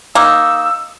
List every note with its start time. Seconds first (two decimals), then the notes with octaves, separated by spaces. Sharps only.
0.15 A#3 D#4 E6